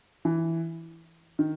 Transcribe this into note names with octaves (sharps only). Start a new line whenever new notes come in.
E3
D#3